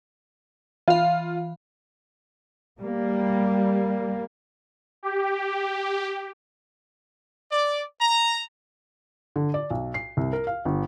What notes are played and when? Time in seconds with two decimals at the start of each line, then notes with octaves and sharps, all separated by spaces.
0.88 E3 F4 F5
2.80 G3 A#3
5.03 G4
7.51 D5
8.00 A#5
9.36 D3
9.54 D5
9.70 B1
9.94 C7
10.17 C2
10.33 A#4
10.47 F5
10.65 G1